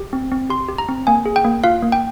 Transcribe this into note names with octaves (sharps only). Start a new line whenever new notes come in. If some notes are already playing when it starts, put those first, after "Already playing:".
Already playing: G4
C4
C4
G4 C6
G4
A#5
C4
A#3 G#5
G#4
G5
A#3
F4 F5
A#3
G5